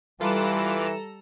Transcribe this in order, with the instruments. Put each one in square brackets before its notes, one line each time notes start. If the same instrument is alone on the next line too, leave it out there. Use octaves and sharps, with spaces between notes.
[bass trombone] E3 [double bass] G3 [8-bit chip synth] F4 B4 D6 [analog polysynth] A4 A#5 E7